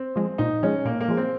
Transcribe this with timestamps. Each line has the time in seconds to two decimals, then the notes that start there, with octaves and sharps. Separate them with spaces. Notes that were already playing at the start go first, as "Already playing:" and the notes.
Already playing: C4
0.16 F3 G#3
0.38 A#2 D#4
0.63 F3 G#3 C#4
0.85 A#2 A#3
1.01 A#3
1.08 F3 G#3
1.17 C4